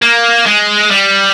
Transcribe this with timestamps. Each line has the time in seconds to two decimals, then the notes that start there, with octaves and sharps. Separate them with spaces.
0.02 A#3
0.46 G#3
0.91 G3